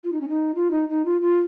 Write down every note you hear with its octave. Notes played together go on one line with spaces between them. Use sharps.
F4
D#4
C#4
D#4
F4
D#4
D#4
F4
F4